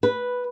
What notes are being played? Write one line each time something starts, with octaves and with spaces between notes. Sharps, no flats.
B4